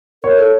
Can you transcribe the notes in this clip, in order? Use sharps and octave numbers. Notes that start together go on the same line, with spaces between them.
A#4 C#5
A4